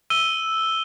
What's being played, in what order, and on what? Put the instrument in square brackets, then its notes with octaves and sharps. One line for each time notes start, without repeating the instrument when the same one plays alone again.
[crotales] E6 D#7 G7